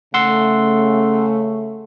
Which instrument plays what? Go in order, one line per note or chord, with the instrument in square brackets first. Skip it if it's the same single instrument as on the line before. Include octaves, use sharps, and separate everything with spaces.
[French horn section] C#3 A3 [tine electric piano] F#5 C6 E6